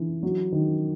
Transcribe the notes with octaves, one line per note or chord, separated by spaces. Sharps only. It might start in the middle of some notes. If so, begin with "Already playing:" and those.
Already playing: E3
F#3
D#3